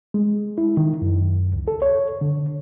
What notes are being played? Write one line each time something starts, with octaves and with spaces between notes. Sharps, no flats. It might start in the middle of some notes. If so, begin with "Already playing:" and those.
G#3
E4
D#3
F#2
C#2
A4
C#5
D3